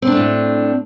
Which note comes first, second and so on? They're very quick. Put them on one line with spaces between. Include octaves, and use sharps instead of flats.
C4 D4 A3 A2